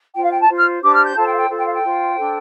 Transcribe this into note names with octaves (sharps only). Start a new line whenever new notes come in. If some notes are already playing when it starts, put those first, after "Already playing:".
F4 C5 G5
F5
G5
A5
F4 C5
F6
D4 G4 C5 D6
F6
G6
F4 A4 C5 A5
G5
F5
G5
F4 A4 C5
G5
F5
G5
F4 C5
D4 A4 C5